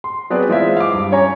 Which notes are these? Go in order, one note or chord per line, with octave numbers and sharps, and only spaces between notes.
C6
F#3 B3 C4 G#4 B4 D5
E3 G#3 F4 C5 E5
F5 D6
G2
C#4 C#5 G#5 A#5